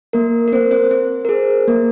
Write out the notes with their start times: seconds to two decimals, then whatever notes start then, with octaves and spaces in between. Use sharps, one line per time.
0.13 A#3 A#4
0.48 A#4
0.52 C4 C5
0.71 C4 C5
0.91 C4 C5
1.25 A#4
1.29 G#4
1.68 A#3 A#4